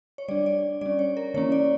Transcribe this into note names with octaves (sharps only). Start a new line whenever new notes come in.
C#5
G3 D4 D5
D5
G3 C#4 D5
C#5
A#4
E3 A#3 C#4 C#5
D5